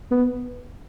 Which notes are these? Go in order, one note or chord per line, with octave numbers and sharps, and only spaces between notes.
B3